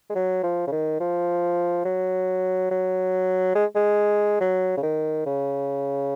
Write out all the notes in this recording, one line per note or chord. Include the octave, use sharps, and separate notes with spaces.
G#3
F#3
F3
C#3
D#3
F3
F#3
F#3
G#3
G#3
F#3
C#3
D#3
C#3